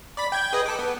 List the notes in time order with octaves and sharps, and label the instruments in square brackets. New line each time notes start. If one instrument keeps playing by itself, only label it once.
[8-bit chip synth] D5 B5 B6
G5 G6 G#6
G#4 B4 D#5
A4 D6
B3